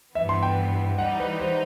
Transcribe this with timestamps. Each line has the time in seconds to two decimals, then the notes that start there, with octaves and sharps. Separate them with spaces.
0.15 G2 E3 B3 E5
0.29 C6
0.43 G5
0.98 E3 G3 D#4 F#5
1.20 B4
1.40 C5